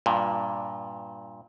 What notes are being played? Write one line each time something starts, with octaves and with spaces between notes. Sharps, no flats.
G2 A#2